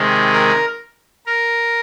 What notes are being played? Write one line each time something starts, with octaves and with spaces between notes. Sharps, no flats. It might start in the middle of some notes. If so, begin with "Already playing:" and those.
Already playing: C3 D#3 G#3
A#4
A#4